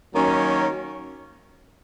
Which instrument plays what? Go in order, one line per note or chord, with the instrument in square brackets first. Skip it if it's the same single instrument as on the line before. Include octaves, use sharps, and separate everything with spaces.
[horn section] D#3 F#3 A#3 C#4